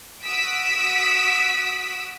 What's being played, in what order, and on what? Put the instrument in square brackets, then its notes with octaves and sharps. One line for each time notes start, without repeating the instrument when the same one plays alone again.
[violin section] F#4 D#6 E6 B6 D7